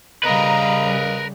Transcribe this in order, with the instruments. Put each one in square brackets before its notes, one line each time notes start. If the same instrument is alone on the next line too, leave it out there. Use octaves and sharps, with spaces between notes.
[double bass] C#3 G3 [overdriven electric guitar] A#4 B4 [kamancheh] D#5 F5 [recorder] A#5